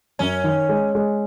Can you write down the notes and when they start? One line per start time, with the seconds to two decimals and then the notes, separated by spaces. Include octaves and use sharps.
0.19 F#2 C#4
0.44 D#3
0.69 G#3
0.95 G#3